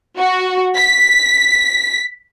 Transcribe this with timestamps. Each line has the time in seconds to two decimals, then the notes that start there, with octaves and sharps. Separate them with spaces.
0.17 F#4
0.76 B6